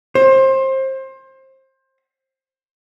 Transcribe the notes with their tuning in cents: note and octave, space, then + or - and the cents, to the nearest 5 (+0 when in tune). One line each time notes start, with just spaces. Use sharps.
C5 +25